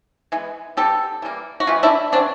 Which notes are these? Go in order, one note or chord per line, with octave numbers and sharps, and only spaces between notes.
E3 G#3 B3
B2 G3 B3 G4 A4
E3 G3 A#3
F#4
C3 E3 G#3 F4 G4
D4 E4
C#3 F#3 B3 C4 D4